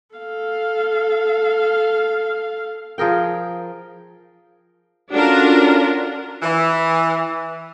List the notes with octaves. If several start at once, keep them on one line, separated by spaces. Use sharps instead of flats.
A4 F5
F3 G#4 A#4 G5
C#4 D4 F4 F#4 A4 A#4
E3